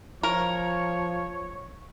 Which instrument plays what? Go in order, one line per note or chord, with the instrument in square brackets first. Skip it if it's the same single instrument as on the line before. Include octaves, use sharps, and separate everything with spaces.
[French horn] F3 [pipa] A#4 [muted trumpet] C#5